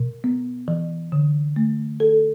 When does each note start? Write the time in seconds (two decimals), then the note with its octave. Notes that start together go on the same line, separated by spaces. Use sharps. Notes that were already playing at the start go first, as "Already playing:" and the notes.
Already playing: B2
0.24 B3
0.68 E3
1.12 D3
1.56 A3
2.00 A4